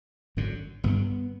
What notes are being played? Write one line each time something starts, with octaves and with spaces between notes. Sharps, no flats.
G#1 F#2 D3
G1 G2 D3 B3